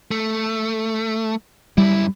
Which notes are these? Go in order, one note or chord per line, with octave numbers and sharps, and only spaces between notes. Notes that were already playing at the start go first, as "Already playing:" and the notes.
A3
F#2 G3 E4